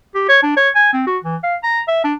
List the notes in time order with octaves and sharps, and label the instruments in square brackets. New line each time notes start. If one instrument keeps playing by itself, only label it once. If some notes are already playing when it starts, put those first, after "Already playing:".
[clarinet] G4
C#5
D4
C#5
G#5
C4
F#4
E3
F5
A#5
E5
D4